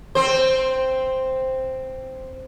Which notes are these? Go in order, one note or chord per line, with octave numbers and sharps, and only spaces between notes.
C4 C5